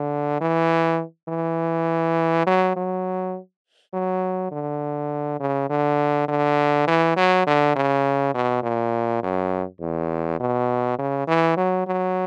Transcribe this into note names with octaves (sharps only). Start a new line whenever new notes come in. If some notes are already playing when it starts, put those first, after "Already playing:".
Already playing: D3
E3
E3
F#3
F#3
F#3
D3
C#3
D3
D3
E3
F#3
D3
C#3
B2
A#2
F#2
E2
B2
C#3
E3
F#3
F#3